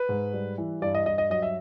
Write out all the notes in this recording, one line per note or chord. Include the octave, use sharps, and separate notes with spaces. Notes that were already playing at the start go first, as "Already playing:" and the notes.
Already playing: B4
G#2
G3
E3
G2 D5
D#5
G2 D#5
D#5
F#3 D#5
E5